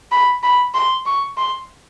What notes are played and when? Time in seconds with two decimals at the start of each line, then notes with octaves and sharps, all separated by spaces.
0.12 B5
0.43 B5
0.74 C6
1.06 C#6
1.37 C6